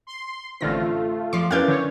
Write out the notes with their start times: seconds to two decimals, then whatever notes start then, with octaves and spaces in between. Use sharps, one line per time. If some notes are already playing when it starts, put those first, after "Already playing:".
0.07 C6
0.61 A1 D3 A3 C4 F4 F6 A#6
1.33 F3 D5 C6
1.51 C#4 D4 E4 A#4 B4 D5 F5 G6
1.68 D3 C#5